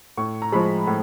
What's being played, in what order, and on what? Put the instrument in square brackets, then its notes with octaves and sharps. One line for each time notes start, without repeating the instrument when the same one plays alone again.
[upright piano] A2 C#6
A#5
F3 G#3 B5
A2